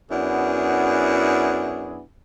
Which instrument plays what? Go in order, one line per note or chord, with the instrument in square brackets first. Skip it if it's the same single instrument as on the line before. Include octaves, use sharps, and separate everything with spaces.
[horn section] F#2 B3 D4 E4 F#4 G#4